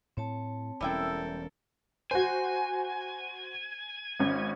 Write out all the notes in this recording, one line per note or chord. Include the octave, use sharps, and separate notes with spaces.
A2 C4 C#5 A5
E1 G3 C#4 E4 A4 A#4 G5
F#4 C5 G#5
G#1 C#4